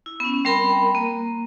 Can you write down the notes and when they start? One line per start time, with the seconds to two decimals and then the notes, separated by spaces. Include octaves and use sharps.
0.06 E4
0.20 B3 C#4
0.45 G3 C4 A#4 G5 B5
0.95 A#3